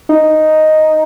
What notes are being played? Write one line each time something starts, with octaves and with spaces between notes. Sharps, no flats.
D#4